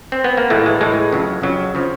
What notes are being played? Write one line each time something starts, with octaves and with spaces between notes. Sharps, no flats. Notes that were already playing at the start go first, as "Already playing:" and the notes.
C4
B3
A#3
A2 E3 G#3 A3
G#3
A2 E3 G#3
F2 C#3 F#3
F2 C#3 F#3
C#3 F3